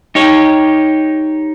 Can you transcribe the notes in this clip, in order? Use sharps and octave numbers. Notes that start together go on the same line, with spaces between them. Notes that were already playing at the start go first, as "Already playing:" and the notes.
D#4 G4 C#5